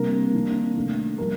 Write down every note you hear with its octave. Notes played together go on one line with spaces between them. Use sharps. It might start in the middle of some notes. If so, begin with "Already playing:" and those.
Already playing: C3 G3 A#3 D4 A#4
C3 D#3 A#3 D4
D#3 A3 D4
G3 A#3 D4 A#4